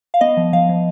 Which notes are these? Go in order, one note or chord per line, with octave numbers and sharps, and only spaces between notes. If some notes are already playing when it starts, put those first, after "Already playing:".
F5
B3 D#5
F3
F3 F5
F3